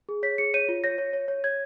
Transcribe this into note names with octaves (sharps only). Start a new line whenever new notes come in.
G#4
C#5 B6
G#4 C#7
C#5 D#7
F4
C#5 A#6
C#5
C#5
C#5
C#5 G#6